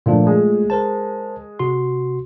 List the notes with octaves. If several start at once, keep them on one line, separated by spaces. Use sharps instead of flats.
A#2 F3 A3 A#3 D4 F4
G#3
A#4 C5 A5
C3 F#4 C6